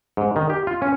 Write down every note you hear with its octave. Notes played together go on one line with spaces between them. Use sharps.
G#2
D#3
G4
F4
C#4